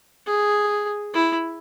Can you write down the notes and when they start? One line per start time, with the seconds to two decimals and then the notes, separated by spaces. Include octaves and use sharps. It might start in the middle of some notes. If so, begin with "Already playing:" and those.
0.26 G#4
1.14 E4